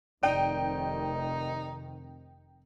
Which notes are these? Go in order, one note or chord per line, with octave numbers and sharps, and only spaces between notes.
F1 D#3 D#4 D5 G5